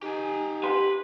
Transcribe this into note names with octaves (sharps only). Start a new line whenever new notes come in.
D#4 G4 G#5
B4 C6